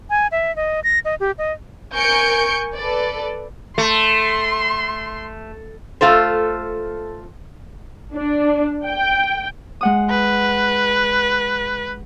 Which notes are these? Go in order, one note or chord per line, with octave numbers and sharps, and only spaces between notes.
G#5
E5
D#5
A#6
D#5
G4
D#5
A#4 G#5 C#6 G6 C#7 D7
A4 B4 D5
A3 C6
A3 F4 A4 C5
D4
G5
G#3 F#5 D#6
B4